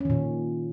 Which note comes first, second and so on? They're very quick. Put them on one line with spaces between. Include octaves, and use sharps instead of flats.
C#4 D#3 A#2